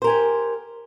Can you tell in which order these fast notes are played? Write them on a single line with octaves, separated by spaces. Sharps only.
C5 A#4 G#5 G4